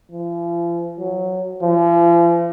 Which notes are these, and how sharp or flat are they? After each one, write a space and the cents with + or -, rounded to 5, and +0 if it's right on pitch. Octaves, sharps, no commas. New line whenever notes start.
F3 -40
F#3 +0
F3 -40